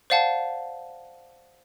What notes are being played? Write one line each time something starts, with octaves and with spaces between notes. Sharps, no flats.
C5 D5 F5 F#5 A5